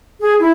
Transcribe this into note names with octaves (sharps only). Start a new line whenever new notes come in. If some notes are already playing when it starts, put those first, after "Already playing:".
G#4
E4